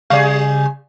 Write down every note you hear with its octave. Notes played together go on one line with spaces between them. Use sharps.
C#3 G3 G#4 D5 F5